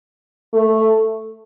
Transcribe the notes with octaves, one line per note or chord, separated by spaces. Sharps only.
A3